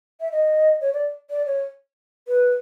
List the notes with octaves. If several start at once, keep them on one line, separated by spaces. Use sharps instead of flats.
E5
D#5
C#5
D5
D5
C#5
B4